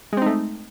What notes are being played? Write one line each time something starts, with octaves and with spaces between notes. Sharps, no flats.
G#3 A3 C4 D#4